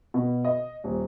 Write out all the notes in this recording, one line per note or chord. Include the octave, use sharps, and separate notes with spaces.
B2
D#5
D#1